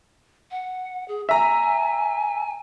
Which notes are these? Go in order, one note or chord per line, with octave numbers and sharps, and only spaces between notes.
F#5
G#4
E5 G#5 A#5